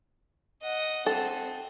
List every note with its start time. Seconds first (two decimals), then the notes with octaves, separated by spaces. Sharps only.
0.62 D#5 F#5
1.06 C4 A4